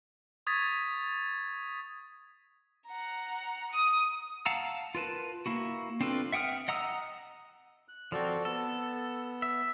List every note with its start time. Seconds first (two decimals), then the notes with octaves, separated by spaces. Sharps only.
0.47 C#6 D#6 G#6 A6 B6
2.87 F#5 A#5
3.71 D#6
4.45 F5 F#5 A5 A#5 E6
4.95 F4 A#4 B4 A5
5.46 A#3 E4 F#4
6.01 C4 D4 F4 A4 B4
6.32 E5 F#5 G5 D#6 F6
6.68 D#5 F#5 A#5 D#6 E6
7.88 F#6
8.12 F3 C4 F#4 A4 D5
8.45 B3 A4
9.42 E5